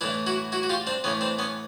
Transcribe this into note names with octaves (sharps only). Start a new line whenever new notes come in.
A2 E3 D4 E4
E4 F#4
E4 F#4
F#4
F4 G4
C4 D4
A2 E3 B3 C#4
C4 D4
B3 C#4